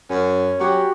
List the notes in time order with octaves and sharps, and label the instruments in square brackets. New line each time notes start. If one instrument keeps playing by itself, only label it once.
[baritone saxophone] F#2 [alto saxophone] C#4
[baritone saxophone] F#3 [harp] F#4 [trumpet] G4